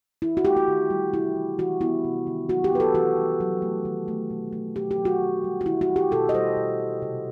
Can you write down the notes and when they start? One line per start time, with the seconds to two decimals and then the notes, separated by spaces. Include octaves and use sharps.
0.22 E3 E4
0.37 F#4
0.45 A3 G4
0.57 F#4
0.68 D#3
0.90 G3
1.13 C3 E4
1.35 E3
1.59 E3 F#4
1.81 B3 E4
2.04 C3
2.27 D#3
2.49 F#3 F#4
2.64 G4
2.72 B3 B4
2.80 A4
2.95 E3 F#4
3.17 G3
3.40 F#3
3.62 A3
3.85 D#3
4.08 A3
4.30 B2
4.53 A3
4.75 B2 G4
4.91 G4
4.98 F#3
5.05 F#4
5.20 D#3
5.44 G3
5.61 F#4
5.66 D#3 E4
5.81 F#4
5.89 G3
5.96 G4
6.11 B2 A4
6.29 D#5
6.34 G3 C5
6.57 B2
6.80 G3
7.02 C3